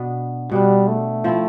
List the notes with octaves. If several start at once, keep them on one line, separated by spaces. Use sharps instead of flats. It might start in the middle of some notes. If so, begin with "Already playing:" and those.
Already playing: B2 B3 D4
B2 G3 B3 D4
A3
F3 C4 E4